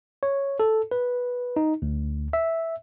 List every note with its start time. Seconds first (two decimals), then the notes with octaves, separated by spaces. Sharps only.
0.23 C#5
0.60 A4
0.91 B4
1.56 D#4
1.82 D2
2.33 E5